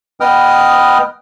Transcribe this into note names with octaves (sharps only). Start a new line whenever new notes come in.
B3 B4 D#5 G5 D#6 F6